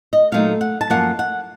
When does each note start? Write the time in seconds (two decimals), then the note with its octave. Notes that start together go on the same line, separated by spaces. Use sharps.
0.13 D#5
0.32 A#2 F#3 A3 D#4 F5
0.61 F#5
0.81 A5
0.90 F#2 F3 A#3 F#5
1.19 F#5